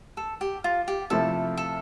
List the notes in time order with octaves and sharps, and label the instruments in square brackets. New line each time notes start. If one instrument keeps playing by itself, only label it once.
[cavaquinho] A4
G4
F4
G4
[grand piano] C3 F3 A3 E4 [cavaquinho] A4
[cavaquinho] A4